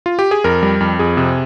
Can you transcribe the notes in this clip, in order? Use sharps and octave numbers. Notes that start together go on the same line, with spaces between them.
F4
G4
G#4
F2 A#4
G3
F2
F2 G#4
C3